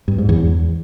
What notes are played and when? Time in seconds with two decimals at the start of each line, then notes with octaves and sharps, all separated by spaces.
0.08 G2
0.18 G#2
0.29 E2